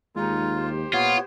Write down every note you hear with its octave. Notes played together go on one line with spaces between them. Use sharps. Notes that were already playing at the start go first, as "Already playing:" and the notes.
D#2 G#3 D#4 F4
G4 C5
A#2 B3 F4 C#5